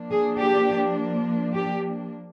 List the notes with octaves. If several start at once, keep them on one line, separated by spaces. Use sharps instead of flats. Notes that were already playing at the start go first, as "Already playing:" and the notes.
Already playing: F3 A#3 D4
G#4
G4
G4